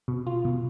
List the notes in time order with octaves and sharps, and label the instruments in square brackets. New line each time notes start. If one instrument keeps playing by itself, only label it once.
[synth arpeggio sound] B2
F4
B2